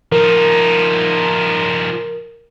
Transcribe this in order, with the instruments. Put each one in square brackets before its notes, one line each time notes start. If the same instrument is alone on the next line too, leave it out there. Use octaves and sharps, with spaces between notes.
[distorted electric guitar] F3 D#4 [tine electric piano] A#4